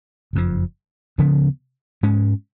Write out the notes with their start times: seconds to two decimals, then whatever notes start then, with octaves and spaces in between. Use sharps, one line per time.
0.33 F#1 F2 F3
1.18 D2 C#3 F3 B3
2.03 G#2 G#3 C#4